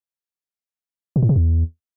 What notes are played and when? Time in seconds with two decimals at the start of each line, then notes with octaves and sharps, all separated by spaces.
1.16 B2
1.22 A2
1.29 C3
1.36 E2